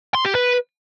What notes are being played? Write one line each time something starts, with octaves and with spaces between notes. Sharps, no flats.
C6
G4
B4